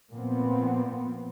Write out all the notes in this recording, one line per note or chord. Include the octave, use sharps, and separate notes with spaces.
A#2 F3 B3 C4